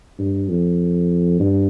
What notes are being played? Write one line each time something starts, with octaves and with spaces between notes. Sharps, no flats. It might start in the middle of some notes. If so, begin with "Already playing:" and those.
G2
F2
G2